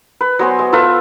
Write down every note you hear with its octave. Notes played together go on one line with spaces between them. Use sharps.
B4
F#3 B3 C5 G#5
G#3
F4 A4 B4 E5